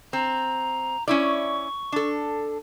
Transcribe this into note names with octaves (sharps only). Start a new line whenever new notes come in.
C4 A#5
C#4 E4 D5 C#6
D4 A4